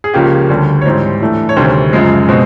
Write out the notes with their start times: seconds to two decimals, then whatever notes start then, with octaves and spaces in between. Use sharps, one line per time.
0.04 G#4
0.14 C#2 C#3 F3 A#3 C#4 G4
0.49 D2 D3 G3
0.81 C#5
0.86 G#2 E3 G3 C4 C5
1.20 A2 E3 A3 D4
1.49 C#5
1.56 D2 C3 D#3 G3 C5
1.93 F#2 C#3 F3 G#3
2.28 B2 G#3 C4